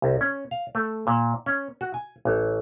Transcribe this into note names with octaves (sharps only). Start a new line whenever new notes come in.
C2
C#4
F5
A3
A#2
C#4
F#4
G#5
A1